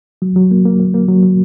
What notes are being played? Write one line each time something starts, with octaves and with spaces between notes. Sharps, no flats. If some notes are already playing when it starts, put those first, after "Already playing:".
F#3
F#3
A#3
A#3
A#3
A#3
F#3
F#3